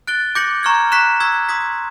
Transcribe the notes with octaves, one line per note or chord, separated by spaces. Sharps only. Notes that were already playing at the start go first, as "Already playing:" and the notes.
F#6 A6 D7 G7
D6 G6 A#6 C#7 F#7
A#5 C#6 F6 G#6
C#6 F#6 B6 E7
C#6 E6 G#6 B6
C6 D#6 G#6 B6